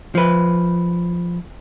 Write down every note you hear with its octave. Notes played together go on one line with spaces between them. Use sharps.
F3 B4